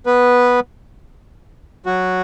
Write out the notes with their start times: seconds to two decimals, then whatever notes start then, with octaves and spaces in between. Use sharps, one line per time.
0.06 B3 B4
1.86 F#3 F#4